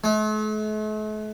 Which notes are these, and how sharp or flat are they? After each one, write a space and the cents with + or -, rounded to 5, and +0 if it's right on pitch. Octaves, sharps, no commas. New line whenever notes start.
A3 -45